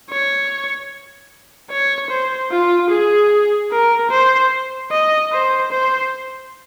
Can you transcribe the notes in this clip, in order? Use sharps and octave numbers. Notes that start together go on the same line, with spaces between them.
C#5
C#5
C5
F4
G#4
A#4
C5
D#5
C5
C5